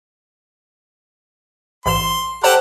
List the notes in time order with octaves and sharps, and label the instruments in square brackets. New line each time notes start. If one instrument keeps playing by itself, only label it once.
[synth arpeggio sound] A1 G#2 E7 [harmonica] C6
[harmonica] G4 A4 F#5 [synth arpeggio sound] C5 A5